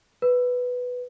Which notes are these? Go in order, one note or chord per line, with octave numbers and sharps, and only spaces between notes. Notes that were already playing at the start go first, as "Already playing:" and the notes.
B4